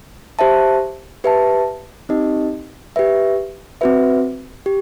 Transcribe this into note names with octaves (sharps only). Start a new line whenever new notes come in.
G4 C5 E5 A5
G4 B4 E5 A5
C4 D#4 G4 D#5
G4 B4 E5
C4 F#4 B4 E5
G4